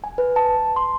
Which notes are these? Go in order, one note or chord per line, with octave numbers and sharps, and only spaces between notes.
G#5
B4
A5
C6